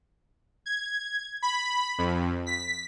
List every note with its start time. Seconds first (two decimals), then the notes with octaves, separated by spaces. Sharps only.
0.66 G#6
1.42 B5
1.98 F2
2.46 B6